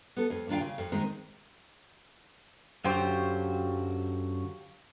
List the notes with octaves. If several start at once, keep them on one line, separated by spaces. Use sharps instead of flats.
B3 A4
F2
D#2 D4 F4 F5 G5
C#3
F2
D#3 G#3 C4
F#2 D3 F#3 F4 G4 C5